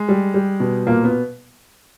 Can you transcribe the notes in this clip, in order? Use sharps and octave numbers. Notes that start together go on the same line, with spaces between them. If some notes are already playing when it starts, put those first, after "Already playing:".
Already playing: G#3
G3
G3
B2
A#2 A#3
B3